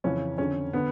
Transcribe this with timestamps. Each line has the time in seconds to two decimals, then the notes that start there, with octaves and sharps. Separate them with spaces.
0.04 F2 C#3 E3 C#4
0.38 F2 D3 C#4
0.73 D3 B3